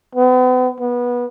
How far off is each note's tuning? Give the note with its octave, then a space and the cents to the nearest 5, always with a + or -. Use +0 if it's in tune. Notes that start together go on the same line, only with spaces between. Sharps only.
B3 +40
B3 -20